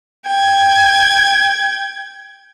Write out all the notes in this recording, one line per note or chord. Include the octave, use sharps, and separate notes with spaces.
G5 G#6